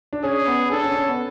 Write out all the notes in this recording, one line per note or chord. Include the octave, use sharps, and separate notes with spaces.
D4
C#4 G#4
B3
D4 A4
C#4
C#4
B3